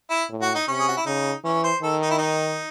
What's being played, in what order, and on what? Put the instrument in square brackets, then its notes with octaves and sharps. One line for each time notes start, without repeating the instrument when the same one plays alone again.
[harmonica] E4
[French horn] A2
[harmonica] F#4
D#4
[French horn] C3 [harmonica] C#4
[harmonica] G#4
F#4
E4
[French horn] C#3 [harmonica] D#4
[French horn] E3 [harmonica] C#4
[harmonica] C5
[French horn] D#3 [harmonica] A4
[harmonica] D#4
E4
D#4